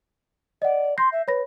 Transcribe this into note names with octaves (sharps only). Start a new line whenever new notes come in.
D5 D#5 F#5
C6 G6 A#6 C7
E5
B4 C#5 B5 A#6